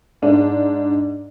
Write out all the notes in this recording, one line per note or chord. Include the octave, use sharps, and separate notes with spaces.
G#2 D4